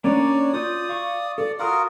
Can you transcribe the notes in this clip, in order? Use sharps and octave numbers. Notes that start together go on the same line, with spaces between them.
A#3 C#4 D4 C#5 D5
F4 D5 D#6 G6
F5 C#6
A4 D5
F4 F#4 A#4 F#5 D#6